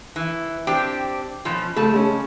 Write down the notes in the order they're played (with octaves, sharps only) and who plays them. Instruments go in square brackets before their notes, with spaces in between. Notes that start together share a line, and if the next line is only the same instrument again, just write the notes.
[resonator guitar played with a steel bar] E3
C4 D4 G4
B2 F3 C#4
[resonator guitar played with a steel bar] C#3 A5 [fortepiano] A3
[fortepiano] G#3 C#4